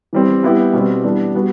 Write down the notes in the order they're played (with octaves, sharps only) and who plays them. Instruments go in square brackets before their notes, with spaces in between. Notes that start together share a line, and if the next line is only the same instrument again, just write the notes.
[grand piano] E3 G3 C4
G3 B3 E4 G4
B2 G3 C4
E3 G3 B3 D4
G3 B3 F#4